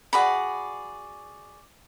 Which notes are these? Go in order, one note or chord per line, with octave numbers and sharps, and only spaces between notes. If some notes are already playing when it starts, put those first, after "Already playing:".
F#4 G#4 D5 B5